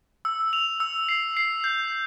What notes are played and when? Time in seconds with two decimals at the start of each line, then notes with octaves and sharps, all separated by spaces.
0.25 E6
0.53 F7
0.80 E6
1.09 C7
1.37 C7
1.64 G6